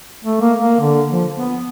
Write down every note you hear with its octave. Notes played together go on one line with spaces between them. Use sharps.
A3
A#3
A#3
D3
F3
B3